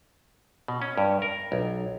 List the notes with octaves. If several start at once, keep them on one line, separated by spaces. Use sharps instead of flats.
B2
C#4
G2
A#4
B1